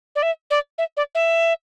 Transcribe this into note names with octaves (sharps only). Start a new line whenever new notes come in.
D5
E5
D5
E5
D5
E5